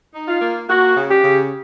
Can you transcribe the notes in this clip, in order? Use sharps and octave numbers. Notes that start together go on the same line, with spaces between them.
D#4
F4
A#3
A#3 F#4
C#3
G4
C#3